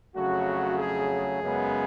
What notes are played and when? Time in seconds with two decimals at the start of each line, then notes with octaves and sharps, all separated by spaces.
0.15 F2 C#3 F#3 A3 F#4
0.78 G#4
1.41 F#2 C#3 G#3 B3